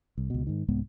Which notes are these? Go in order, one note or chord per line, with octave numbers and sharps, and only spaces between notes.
C2
C#2 B2
G#2 D#3
C2 G#2 G#3 B3